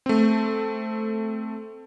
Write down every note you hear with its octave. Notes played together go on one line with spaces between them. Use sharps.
A3 C4